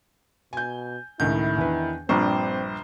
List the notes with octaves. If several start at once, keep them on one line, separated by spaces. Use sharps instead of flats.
B2 G#5 G6
C#2 A2 D#3 E4 G6
E2 D4 B4
A#1 G2 C4 C5 C#6